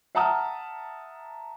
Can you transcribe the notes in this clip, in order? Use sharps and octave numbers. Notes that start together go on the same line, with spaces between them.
E5 F#5 A5 A#5 D#6 F6